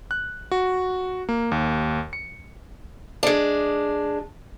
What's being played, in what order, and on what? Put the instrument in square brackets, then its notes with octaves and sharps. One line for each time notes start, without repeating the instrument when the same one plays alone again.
[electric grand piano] F#6
F#4
A#3
D#2
C#7
[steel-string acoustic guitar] G#3 D4